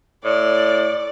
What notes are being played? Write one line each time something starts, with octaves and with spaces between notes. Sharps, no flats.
A2 D5